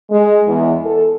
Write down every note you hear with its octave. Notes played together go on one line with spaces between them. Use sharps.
G#3
E2
A4